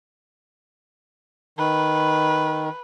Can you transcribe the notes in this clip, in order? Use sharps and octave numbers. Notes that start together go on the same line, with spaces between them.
D#3 B4